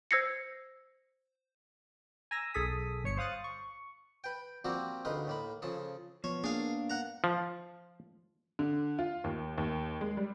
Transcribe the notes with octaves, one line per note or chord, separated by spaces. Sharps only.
C5 E6 G#6 A#6 C7 C#7
G#5 A#5 E6 A#6
B1 G#4 A4 D#6 B6
G1 C#5 C#7
C5 F5 D#6 F#6 A6
C#6
B4 G5
F3 G3 A#3 C4 F#4 G4
D2 G#3 D#4 B4 F5 C6
A2 A#3 B5
C#3 F3 G#4 A4
F3 B3 C#5
A#3 D4 G#4 F5
F#5 A#5
F3
D3
F4
D#2
D#2
G#3
G3